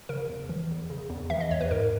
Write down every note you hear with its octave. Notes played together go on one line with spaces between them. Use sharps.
C#3 A#4
E2
E3
E2
C#3
E2
E3 E5
D#5
E2 C#5
B4
G#2 A#4